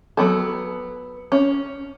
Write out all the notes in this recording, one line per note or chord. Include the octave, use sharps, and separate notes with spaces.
F#3 B3 A4
C#4